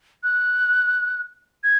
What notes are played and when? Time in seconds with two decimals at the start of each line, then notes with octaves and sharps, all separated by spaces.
0.23 F#6
1.64 G#6